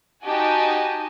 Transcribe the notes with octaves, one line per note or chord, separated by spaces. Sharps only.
D#4 F#4 G4 D#5 G#5 A5